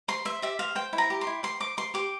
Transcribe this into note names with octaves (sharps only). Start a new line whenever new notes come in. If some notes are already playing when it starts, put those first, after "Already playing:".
C5 C6
C5 E5
G4 E5
C5 F5
C5 G5
E4
A#5
G4
C6
E4
C5 C6
C5 D6
C5 C6
G4 D6